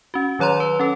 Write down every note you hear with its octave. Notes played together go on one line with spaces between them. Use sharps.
C#4 F#4
D#3 F#3 C#5 A#5 C6
B4
C#4 A4